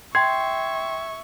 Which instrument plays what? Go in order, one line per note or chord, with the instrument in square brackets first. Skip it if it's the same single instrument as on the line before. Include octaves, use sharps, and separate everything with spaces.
[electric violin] E5 C#6 [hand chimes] G5 C7 [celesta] C6 [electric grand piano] G#6